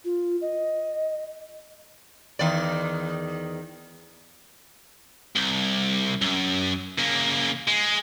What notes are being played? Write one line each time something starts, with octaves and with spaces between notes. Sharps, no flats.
F4
D#5
E2 D#3 D5
C2
F#2
C#3 A#3
G#3